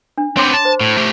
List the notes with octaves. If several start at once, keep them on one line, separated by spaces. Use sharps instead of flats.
D4
B3 C4 C#5 C6 D6
A5
C5
A2
A3 G4